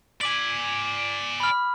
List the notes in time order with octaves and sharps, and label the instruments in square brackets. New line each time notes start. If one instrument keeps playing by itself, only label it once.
[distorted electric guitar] D5 G#5 [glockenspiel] D6 B6 F#7
[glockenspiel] B5 F6